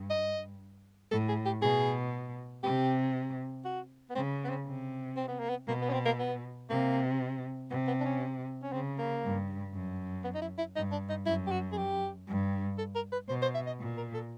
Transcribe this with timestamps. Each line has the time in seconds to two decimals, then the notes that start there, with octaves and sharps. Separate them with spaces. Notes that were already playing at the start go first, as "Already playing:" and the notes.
Already playing: G2
0.10 D#5
1.11 A2 A4
1.28 G#4
1.46 G4
1.62 B2 G#4
2.63 C3 G4
3.65 F#4
4.10 B3
4.15 C#3 C4
4.44 B3
4.50 C4
4.66 C3
5.17 C4
5.28 B3
5.39 A#3
5.49 B3
5.68 B2 A#3
5.81 B3
5.89 C#4
5.93 C4
6.05 A#3
6.19 B3
6.70 C3 A#3
7.70 C3 B3
7.88 B3
8.00 D4
8.05 C#4
8.63 C#4
8.72 C#3 C4
8.98 A#3
9.24 G2
9.74 F#2
10.24 B3
10.35 D#4
10.42 E4
10.58 E4
10.76 G2 D#4
10.92 D4
11.09 D#4
11.26 F#2 E4
11.47 G4
11.51 F#4
11.72 G#4
11.77 G4
12.28 G2
12.78 A4
12.95 A#4
13.12 B4
13.29 B2 C5
13.42 C5
13.55 E5
13.67 D#5
13.80 A#2
13.97 A#4
14.14 A4